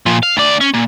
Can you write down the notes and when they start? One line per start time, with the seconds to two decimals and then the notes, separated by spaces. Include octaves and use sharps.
0.06 A#2 F3
0.23 F5
0.37 D2 D5
0.61 C#4
0.74 A#2